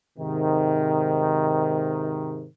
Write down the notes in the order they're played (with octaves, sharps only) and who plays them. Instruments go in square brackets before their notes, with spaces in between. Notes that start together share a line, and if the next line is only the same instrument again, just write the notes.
[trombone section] G#2 C3 D#3